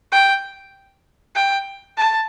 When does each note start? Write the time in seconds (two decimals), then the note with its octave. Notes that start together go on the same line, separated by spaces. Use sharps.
0.12 G5
1.35 G5
1.97 A5